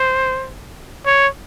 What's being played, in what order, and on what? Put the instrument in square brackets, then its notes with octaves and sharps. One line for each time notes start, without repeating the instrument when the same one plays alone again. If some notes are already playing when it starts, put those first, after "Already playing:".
Already playing: [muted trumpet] C5
C#5